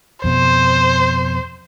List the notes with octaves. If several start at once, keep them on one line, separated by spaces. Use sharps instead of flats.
F2 B2 C5